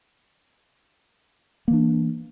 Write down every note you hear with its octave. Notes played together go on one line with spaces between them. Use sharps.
E3 A#3 D4